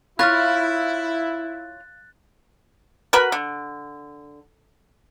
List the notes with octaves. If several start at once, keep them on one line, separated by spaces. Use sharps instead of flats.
E4 F4 C#5 F5 B5 F6 F#6 A6
F#4 A#4 B4 B5
D3